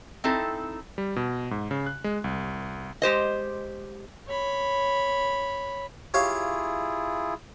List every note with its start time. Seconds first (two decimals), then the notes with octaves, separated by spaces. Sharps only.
0.24 C4 D#4 E4 A4
0.98 G3
1.16 B2
1.51 G#2
1.71 C#3
1.86 F#6
2.04 G#3
2.24 C2
3.02 G#3 G4 C5 D#5
4.28 C#5 B5
6.14 E4 F4 G4 G#4 C#5 F5